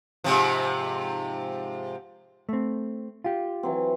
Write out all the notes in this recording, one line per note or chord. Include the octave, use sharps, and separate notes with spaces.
G#2 C3 F3
A3 C4
F4 G4
E3 F#3 C4